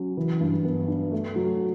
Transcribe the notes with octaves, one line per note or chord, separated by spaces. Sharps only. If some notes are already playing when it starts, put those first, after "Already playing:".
Already playing: F#3 C#4
E3
G2
B3
D4
A3
F#3